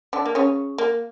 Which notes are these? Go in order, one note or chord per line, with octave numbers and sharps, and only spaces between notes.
D3 D4
A#3
C#3 C#4
A#3